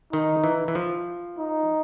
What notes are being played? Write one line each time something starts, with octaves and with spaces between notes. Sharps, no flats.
D#3 D#4
E3
E3
F3
D#4